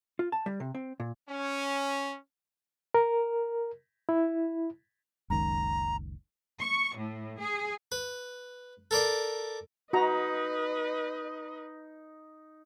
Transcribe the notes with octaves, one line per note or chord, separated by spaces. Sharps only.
F4
A5
G3
C3
C4
A#2
C#4
A#4
E4
F#1 C#2 D#3 A#5
C#6
A2
G#4
B4
A4 A#4 D5 C6
D#4 F#4 B4 D#5 A#5